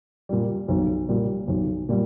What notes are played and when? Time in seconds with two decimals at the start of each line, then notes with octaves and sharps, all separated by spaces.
0.29 A#2 G3
0.68 B1
1.09 A#2 G3
1.48 B1
1.89 A#2 G3